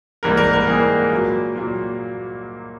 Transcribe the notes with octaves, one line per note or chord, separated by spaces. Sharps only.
G#2 E3 G3 A#3 A#4
A#4
A#4
G#2 E3 G3 A#3 G#4
A#2 F#3 A#3
A#2 F#3 A#3